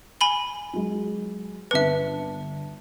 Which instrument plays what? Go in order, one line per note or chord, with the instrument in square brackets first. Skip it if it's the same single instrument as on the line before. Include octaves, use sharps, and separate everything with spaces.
[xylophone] G#5 B5 G7
[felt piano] F#3 G#3
[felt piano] G1 A5 C#7 [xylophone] B4 E5